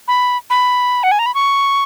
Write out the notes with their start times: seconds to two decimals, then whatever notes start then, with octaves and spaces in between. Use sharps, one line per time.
0.08 B5
0.50 B5
1.03 F#5
1.11 G#5
1.19 A#5
1.26 B5
1.34 C#6